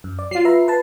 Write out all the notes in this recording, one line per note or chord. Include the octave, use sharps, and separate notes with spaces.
F#2
D5
F#3 F4 C7
B4 E5 A#5
B4 A5